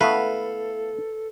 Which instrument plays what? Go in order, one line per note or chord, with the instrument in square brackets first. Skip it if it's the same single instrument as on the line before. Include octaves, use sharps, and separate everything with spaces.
[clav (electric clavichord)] A3 B3 [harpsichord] E4 F5 [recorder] A4 [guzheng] B4